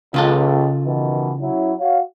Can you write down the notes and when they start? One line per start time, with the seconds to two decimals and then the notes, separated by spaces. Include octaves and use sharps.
0.14 C#2 C#3 F4 A4
0.84 B2 D#3 E3
1.41 F#3 C#4 E4
1.80 F#4 C#5 F5